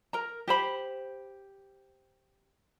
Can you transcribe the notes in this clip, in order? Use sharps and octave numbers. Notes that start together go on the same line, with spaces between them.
A#4 A#5
G4 C5 B5